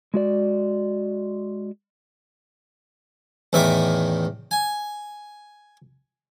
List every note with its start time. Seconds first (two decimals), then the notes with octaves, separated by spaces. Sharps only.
0.14 G#3 F#4 D5
3.53 E2 A2 D#3 E5 D6
4.51 G#5